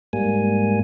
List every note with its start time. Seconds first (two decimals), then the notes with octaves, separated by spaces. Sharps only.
0.13 G#2 G3 A#3 G#5